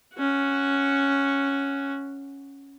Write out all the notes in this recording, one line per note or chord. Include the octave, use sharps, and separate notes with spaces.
C#4 F#4